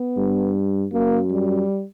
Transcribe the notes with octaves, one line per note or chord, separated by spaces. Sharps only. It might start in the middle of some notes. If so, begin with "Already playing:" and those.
Already playing: B3
G2
F#2 A#3
G3